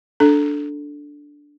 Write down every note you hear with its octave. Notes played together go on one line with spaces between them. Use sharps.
D4 A4